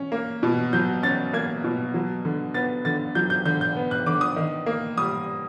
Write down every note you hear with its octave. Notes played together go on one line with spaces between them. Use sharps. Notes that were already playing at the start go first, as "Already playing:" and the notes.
Already playing: C#4
A#3
B2
F#3 G6
C#4 A6
A#3 G#6
B2
F#3
D3
B3 A6
D3 A6
F#3 G6
G6
D3 G6
G6
B3
F#6
D3 D6
D#6
D#3
A#3
G3 D#6